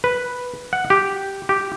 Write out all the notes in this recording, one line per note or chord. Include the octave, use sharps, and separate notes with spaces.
B4
F#5
G4
G4